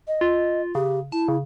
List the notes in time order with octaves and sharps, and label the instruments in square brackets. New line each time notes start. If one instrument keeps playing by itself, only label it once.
[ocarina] D#5
[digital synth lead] F4
[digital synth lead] C#3 [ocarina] G4
[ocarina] E4 [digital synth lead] A5
[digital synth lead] C#3